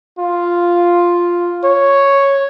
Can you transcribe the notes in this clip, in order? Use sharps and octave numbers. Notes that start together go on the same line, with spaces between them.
F4
C#5